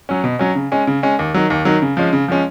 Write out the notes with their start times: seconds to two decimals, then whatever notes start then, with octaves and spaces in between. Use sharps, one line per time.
0.09 F#3 C#4
0.24 B2
0.39 F#3 C#4
0.55 C#3
0.72 G#3 C#4
0.87 C#3
1.03 G#3 C#4
1.19 D#2
1.34 D#3 F#3
1.50 D#2
1.65 D#3 F#3
1.82 C#3
1.97 F3 G#3 C#4
2.13 C#3
2.28 F3 G#3 C#4